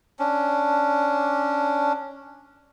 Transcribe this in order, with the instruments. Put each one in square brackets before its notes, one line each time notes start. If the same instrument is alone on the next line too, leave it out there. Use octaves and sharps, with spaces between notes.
[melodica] C#4 D4